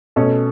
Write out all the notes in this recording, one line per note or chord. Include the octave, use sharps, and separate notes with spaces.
B2 A3 C#4 A4